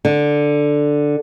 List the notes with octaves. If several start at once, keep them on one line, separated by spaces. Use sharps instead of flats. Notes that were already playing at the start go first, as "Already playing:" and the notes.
D3